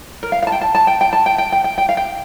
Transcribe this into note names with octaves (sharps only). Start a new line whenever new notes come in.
A#4
F5
F5
A5
G5
A5
A5
G5
G5
A5
G5
G5
G5
G5
G5
F5
G5